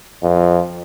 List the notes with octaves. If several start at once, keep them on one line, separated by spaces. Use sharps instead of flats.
F2